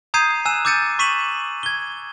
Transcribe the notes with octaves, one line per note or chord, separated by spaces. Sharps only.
A#5 D#6 G6 G#6 C7 D#7
G#5 E6 F#6 D#7 E7
D6 E6 G6 A6 C#7 D#7
C#6 B6 D#7 E7 F#7
G#6 G7